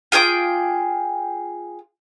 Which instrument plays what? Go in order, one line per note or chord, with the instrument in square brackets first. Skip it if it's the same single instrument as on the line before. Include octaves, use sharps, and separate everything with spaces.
[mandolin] F4 G#4 G5 D6